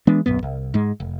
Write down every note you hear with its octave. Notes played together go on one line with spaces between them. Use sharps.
E3 G#3 B3 D4
D1 A#1 F#2 B3
C2
G#2 G#3
F1